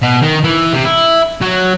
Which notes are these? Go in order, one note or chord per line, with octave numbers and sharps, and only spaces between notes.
B2
D#3
E3
C3
E4
F#3